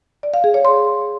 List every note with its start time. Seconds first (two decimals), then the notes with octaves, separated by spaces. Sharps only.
0.23 D5
0.34 F5
0.44 G#4
0.54 C#5
0.65 C6